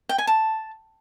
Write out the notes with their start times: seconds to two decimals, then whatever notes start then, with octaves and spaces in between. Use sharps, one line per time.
0.09 G5
0.18 G#5
0.27 A5